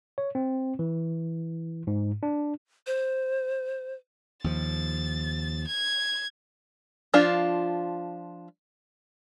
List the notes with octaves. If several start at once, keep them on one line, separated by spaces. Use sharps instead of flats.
C#5
C4
E3
G#2
D4
C5
D#2 F3 A6
G#6
F3 D4 F4